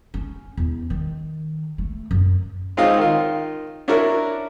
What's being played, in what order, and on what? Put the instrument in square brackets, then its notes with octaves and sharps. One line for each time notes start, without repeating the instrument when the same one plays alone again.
[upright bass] C#4
E2
D#3
A3
F#2
[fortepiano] G#3 C4 C#4 D#4 F4
D#3 F4
C#4 D4 E4 F#4 A#4